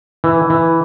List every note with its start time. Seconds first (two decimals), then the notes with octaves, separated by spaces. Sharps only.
0.24 E3
0.50 E3